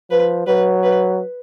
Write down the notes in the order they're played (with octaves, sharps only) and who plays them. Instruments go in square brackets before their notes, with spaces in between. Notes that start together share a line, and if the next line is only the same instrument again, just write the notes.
[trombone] F3 [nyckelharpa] B4
[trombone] F#3 [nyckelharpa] B4
[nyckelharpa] B4